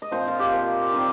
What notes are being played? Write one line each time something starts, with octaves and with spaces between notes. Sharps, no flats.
D#5
A#2 F3 C4 C5
F4
G4
A#2 F3 C4
D#3 G3 C4